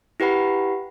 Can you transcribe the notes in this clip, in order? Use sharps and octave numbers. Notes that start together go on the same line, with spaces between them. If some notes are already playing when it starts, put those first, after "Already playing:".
E4 G4 B4 F#5 B5